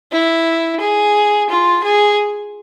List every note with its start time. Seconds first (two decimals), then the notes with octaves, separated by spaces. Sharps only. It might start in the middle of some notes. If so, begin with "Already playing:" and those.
0.12 E4
0.80 G#4
1.50 F4
1.84 G#4